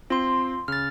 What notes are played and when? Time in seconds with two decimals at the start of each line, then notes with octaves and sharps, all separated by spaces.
0.10 C4 F4 C6
0.68 C#3 F6 A6